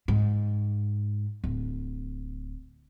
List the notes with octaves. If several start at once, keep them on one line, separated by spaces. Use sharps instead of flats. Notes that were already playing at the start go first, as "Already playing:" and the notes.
G#2
D1